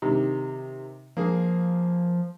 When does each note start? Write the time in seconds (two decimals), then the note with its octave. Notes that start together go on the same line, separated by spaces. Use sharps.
0.02 C3 D#3
1.17 F3 A#3 G#4